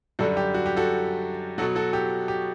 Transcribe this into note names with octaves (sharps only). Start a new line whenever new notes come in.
F#2 D3 G3 F#4 A4
G4
F#4
G4
F#4 A4
B2 F#3 F#4 A4
F#4 A4
G4
G4